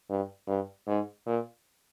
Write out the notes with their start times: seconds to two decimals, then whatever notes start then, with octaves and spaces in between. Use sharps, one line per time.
0.09 G2
0.47 G2
0.87 G#2
1.26 A#2